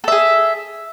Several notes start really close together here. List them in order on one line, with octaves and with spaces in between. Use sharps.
A4 E5 G#4